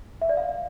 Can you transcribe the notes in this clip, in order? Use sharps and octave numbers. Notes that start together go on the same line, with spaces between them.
E5
D5
F5